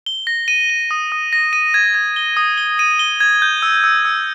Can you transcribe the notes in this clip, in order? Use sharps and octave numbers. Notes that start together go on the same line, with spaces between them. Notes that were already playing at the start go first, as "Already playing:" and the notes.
G7
A#6
D#7
G7
D#6
D#6
A#6
D#7
G#6
G#6
G7
D#6
G7
D#7
G7
G#6
G6
E6
E6
E6